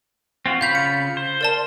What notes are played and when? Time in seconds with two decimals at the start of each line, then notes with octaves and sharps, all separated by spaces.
0.46 C4 F4 F#4
0.61 C#3 F4 F5 B5 G6 F7
0.75 C#7
1.17 C5
1.41 A#4 D5 A5